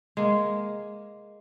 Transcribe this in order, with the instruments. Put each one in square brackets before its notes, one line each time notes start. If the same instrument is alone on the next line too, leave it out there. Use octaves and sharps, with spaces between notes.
[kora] G#3 A#3